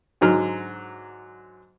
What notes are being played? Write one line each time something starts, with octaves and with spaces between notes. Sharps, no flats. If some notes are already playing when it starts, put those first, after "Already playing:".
G#2 D3 F#3 A#5 F6